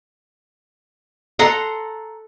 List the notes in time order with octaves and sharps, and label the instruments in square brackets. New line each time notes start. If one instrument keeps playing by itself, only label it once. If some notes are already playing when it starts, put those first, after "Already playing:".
[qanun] A4 F#5 A#5 C6